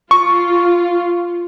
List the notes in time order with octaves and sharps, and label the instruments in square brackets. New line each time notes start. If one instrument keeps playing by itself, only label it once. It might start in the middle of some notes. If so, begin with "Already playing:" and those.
[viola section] F4 [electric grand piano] C#6